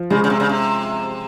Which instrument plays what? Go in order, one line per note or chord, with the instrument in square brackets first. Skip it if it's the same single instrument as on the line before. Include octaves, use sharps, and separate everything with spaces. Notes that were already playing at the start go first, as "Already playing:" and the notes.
Already playing: [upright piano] F3
[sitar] C#3 [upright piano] G#3
[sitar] C#3
C3
C#3
C3